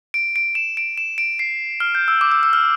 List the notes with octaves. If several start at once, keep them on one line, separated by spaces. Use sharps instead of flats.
D7
D7
E7
D7
E7
D7
C7
F6
G6
E6
D6
E6
E6
F6